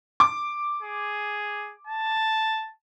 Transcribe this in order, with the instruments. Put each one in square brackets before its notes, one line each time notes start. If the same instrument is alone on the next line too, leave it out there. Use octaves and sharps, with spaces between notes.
[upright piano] D6
[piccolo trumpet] G#4
A5